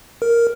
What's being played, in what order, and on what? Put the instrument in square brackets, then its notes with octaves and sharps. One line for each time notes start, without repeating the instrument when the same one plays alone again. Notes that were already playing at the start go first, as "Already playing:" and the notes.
[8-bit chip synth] A#4